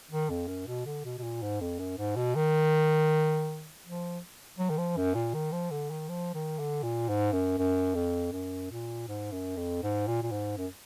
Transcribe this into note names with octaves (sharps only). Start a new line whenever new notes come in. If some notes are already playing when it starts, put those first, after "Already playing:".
D#3
F2
F#2
B2
D3
B2
B2
A#2
G#2
F2
F#2
G#2
B2
D#3
F3
F#3
D#3
F3
F#2
A#2
D#3
F3
D3
D#3
F3
D#3
D3
A#2
G#2
F#2
F#2
F2
F#2
A#2
G#2
F#2
F2
G#2
A#2
A#2
G#2
F#2